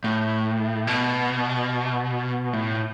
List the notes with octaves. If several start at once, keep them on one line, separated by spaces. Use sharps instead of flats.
A2
B2
A2